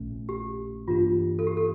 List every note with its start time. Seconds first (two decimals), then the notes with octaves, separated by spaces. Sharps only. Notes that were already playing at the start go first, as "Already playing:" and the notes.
Already playing: A#1 A#2 A3 C#4
0.29 G4
0.87 G2 E3 A#3 D4 F4 G4
1.39 A4
1.47 G4
1.57 A4